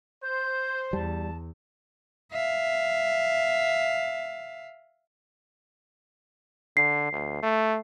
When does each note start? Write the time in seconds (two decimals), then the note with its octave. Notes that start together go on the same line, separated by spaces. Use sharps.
0.23 C5 G6
0.93 E2 G3 A5
2.32 E5 F5
6.77 D3 C7
7.12 D2
7.42 A3